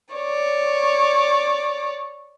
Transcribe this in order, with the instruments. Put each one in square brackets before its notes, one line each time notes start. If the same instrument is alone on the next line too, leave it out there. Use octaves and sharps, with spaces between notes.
[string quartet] C#5 D5